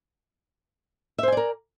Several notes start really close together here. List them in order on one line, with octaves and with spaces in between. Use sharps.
E5 C5 G#5 D5 A#4